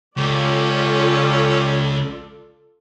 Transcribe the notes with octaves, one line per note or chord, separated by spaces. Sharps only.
C#2 C#4 F4 G4 A4 D5